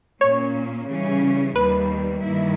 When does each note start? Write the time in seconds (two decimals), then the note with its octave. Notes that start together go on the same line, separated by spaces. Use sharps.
0.21 A#2 A#3 C#4 C#5
0.88 C#3 E3 G3 C#4
1.55 D#2 D#3 G3 A#3 B4
2.23 G2 D#3 A#3 E4